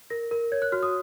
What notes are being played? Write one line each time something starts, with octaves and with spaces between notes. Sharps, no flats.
A#4 A#6
A#4
C#5 G#6
F#6
F#4 F6
D#6